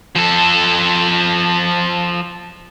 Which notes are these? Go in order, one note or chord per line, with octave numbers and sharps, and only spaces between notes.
F3 A4